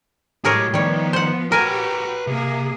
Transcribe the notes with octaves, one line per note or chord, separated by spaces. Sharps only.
B1 A2 F#3 G#3 G4 G#4 A#4 C#5
D#3 F3 G3 B3 C#5
C5 F#5
F#4 G4 A#4 B4 G#5 A#5
C3 A#3 G#4